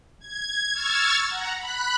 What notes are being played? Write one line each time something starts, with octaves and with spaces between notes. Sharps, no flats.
G#6
C#6 E6 F6 G#6 A6
F#5 A#5
B5 F#6